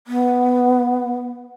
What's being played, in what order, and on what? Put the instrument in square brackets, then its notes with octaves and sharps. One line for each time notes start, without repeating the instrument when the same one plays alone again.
[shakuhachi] B3